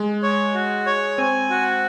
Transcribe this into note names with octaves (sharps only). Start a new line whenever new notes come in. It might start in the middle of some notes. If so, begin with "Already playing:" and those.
Already playing: G#3
C#5
F#4
C#5
C4 G#5
F#4